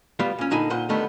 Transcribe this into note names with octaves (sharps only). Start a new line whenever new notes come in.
G3 B3 F4
A#2 C#4
A#2 D3 D#4 G#5 B5
A#2 C5 F#5 C6
D3 D#3 G3 A3 B3